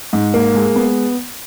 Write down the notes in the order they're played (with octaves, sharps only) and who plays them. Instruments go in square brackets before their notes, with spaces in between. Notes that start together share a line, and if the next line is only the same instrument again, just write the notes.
[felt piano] G#2
A#3
G#3
B3